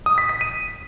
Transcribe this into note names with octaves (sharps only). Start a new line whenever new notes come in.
D#6
B6
B6
D#7